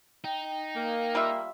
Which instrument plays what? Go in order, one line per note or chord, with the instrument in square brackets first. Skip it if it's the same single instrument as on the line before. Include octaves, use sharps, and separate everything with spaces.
[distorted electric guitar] D#4 [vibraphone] G5
[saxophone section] A#3
[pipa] G3 F4 E5